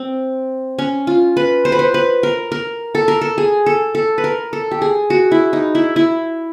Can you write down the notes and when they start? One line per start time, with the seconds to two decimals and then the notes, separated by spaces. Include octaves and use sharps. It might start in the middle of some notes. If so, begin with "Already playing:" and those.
Already playing: C4
0.79 C#4
1.07 F4
1.37 B4
1.65 C5
1.72 B4
1.79 C5
1.94 B4
2.23 A#4
2.52 A#4
2.95 A4
3.08 A#4
3.21 A4
3.38 G#4
3.66 A4
3.95 A4
4.18 B4
4.24 A#4
4.53 A4
4.71 G4
4.82 G#4
5.10 F#4
5.32 E4
5.53 D#4
5.75 E4
5.96 E4